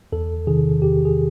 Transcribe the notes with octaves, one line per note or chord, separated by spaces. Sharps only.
E2 A4
C3 D#3 G#4
E2 G4
G#4